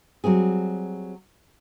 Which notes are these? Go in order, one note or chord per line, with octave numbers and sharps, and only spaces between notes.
F#3 G3 C4 G#4